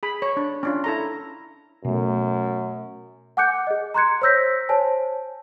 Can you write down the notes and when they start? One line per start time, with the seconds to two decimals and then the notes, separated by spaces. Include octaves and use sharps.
0.03 G#4 B5
0.22 C#5
0.37 D4
0.63 C#4 D4 F4
0.84 E4 A4 A#5
1.85 F#2 B2 A3
3.37 F#5 G#5 D6 F#6 G6 C#7
3.67 G#4 D#5
3.94 A#5 C6 F#6 G#6 C#7
4.22 C5 C#5 E6 G6 A#6 B6
4.69 C5 C#5 G#5 A5